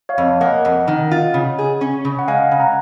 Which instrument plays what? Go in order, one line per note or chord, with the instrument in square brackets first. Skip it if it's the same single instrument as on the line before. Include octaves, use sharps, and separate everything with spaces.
[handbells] C#5 F5
[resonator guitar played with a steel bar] F2
[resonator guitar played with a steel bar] A#3 [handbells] D#5 F#5
[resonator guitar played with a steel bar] F2
D#3
F4
C#3
G#4
C#4
C#3
[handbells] F#5
[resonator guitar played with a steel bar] G#3 [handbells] F5 G#5
[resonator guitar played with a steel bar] C#3
[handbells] F#5 A#5